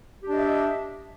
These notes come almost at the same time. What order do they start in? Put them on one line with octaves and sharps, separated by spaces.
G4 D4 D#5 E5